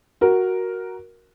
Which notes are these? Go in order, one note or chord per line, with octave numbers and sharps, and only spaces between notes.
F#4 A#4